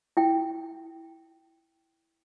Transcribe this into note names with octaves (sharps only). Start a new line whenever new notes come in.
E4 G5